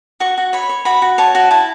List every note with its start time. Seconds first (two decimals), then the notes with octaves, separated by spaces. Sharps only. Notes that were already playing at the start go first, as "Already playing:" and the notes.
0.20 F#4 C#6
0.38 F#4
0.53 C#5 B5
0.69 C#5
0.85 F#4 B5
1.02 F#4
1.18 C#5 A5
1.35 F#4
1.51 E4 A5